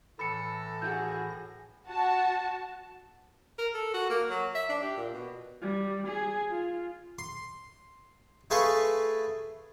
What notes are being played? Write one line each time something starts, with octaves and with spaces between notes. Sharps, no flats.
A2 E3 A4 B5 A#6 C#7
F#4 G#4 G6
F#4 A5
A#4
A4
F#4
A#3
F#3
E5
D4
G4
A#2
B2
G3
G#4
F4
C6
A3 G#4 B4 F5 C6 C#6